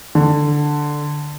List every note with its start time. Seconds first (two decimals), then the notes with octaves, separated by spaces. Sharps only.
0.15 D3